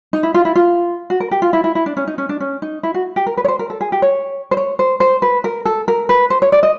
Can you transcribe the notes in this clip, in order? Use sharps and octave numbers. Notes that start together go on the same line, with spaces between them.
D#4
E4
F4
E4
F4
F#4
A#4
G4
F4
E4
E4
E4
D4
C#4
D#4
C#4
D4
C#4
D#4
E4
F#4
G4
A#4
B4
C#5
C5
A#4
A4
G#4
G4
C#5
C5
C#5
C5
C5
B4
A#4
A4
A#4
B4
C5
C#5
D5
D#5